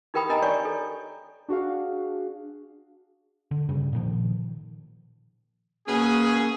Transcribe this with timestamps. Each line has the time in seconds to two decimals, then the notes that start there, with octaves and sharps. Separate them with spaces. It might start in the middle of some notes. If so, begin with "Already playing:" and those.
0.14 D#4 G4 A#4 G5 B5 D#6
0.29 D4 A#4 D#5 G#5 A#5
0.42 C#5 D5 G#5 C#6
0.65 A4
1.49 D4 F#4 G#4 F5
3.51 D3
3.69 G2 C#3
3.93 A#2 D#3 F3
5.87 B2 A#3 C#4 G#4